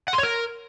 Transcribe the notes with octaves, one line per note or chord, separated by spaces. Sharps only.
F#5
C6
C#5
A#4